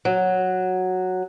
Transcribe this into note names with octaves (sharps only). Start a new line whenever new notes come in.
F#3